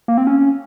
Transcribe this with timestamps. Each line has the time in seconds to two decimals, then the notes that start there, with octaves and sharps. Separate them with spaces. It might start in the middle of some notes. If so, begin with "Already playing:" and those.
0.08 A#3
0.18 C4
0.27 C#4